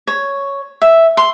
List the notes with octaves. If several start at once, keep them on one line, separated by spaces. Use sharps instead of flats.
C#5
E5
C6